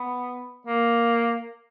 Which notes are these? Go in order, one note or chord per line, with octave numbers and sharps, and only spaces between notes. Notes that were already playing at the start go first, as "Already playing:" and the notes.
Already playing: B3
A#3